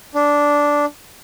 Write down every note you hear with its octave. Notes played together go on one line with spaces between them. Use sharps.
D4